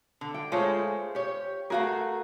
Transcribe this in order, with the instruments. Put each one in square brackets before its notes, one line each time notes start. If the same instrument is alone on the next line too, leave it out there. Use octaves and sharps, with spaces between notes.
[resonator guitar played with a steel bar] D3
[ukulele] G5
[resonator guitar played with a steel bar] G#3 A3 C#5 [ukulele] F4 C5 A5
[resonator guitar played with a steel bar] G4 C#5
[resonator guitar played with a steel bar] A3 F#4 A#4 [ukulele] G#4 F5